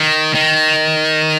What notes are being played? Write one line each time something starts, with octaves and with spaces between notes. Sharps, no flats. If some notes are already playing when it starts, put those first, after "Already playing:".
Already playing: D#3
D#3